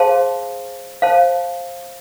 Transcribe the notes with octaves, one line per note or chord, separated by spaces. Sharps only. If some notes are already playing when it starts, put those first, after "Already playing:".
Already playing: G#4 C5 F5 A5 C6
C5 F5 A5